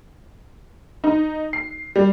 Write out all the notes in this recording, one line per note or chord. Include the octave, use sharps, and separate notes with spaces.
D#4
C7
G3